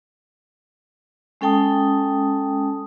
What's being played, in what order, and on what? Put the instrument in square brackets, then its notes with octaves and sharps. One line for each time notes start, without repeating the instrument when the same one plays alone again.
[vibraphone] G#3 C#4 A4 G5 A5 D#6